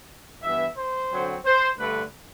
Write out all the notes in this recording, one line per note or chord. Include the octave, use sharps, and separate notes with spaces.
G2 E3 B3 E5
C5
D3 F#3 C4
C5
G2 D3 A3 B4